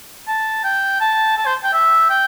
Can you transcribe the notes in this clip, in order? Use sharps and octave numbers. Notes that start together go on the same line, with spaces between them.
A5
G5
A5
A5
C5
G5
E5
G5